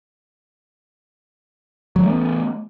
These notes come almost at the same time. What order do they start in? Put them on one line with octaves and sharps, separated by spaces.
F#3 E3 A3 B3